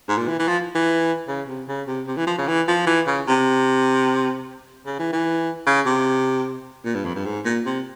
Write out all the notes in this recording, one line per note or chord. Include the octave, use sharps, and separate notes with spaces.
G#2
A#2
E3
E3
F3
E3
C#3
C3
C#3
C3
C3
E3
F3
C#3
E3
F3
E3
C#3
C3
C#3
E3
E3
C#3
C3
A#2
G2
F2
G2
G#2
A#2
C3